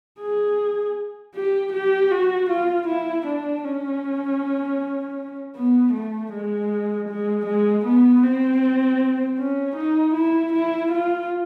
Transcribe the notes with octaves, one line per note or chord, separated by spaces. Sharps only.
G#4
G4
G4
F#4
F4
E4
D4
C#4
B3
A3
G#3
G#3
G#3
B3
C4
C#4
D#4
E4
E4
F4